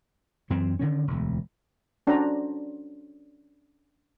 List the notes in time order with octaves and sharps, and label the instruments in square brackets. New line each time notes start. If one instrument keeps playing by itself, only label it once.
[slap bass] F#2 E3 C4
D3 D#3 C#4
E1 D2
[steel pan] C#4 D4 F#4 C5 D5 A#5